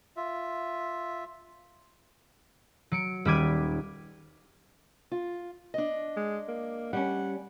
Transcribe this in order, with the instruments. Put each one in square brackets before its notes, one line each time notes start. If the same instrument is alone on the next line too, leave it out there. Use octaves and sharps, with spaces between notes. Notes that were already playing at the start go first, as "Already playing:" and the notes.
[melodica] F4 E5
[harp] F#3 C#7 D7
D#1 G3 B5 D6 G#6 D#7
[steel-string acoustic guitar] F4
D4 D#5
[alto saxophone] G#3
A#3
[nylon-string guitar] G3 C#4 [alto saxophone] F#5